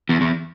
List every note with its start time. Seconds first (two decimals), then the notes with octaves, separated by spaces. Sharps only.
0.09 E2
0.21 E2